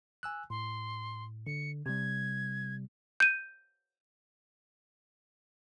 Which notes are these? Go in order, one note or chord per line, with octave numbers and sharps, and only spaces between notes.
G#5 E6 F#6
A2 C6
D3 C#7
C3 G3 G#6
G6 D#7